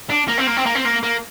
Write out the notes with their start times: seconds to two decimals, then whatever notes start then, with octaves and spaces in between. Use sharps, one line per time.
0.10 D4
0.28 A#3
0.38 C4
0.47 A#3
0.57 C4
0.66 A#3
0.75 C4
0.85 A#3
1.03 A#3